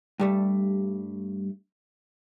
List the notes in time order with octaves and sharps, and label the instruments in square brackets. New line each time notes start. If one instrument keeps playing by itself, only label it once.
[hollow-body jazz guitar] G2 G3 A3